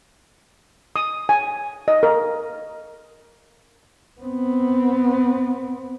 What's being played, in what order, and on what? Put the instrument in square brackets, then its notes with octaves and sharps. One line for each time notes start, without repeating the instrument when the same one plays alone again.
[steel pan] D#6
G#5
D#5
A#4
[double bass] B3 C4